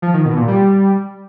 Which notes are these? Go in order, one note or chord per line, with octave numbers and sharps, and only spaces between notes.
F3
D#3
B2
A#2
G3